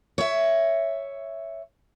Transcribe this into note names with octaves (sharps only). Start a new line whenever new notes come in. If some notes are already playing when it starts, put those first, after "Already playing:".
C#5 E5